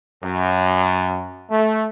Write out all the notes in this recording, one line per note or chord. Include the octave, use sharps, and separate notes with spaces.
F#2
A3